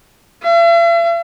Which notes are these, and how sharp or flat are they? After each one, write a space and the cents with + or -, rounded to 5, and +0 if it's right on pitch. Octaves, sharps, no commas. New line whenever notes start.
E5 +45